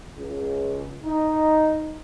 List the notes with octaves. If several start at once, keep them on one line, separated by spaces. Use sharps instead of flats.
C#2
D#4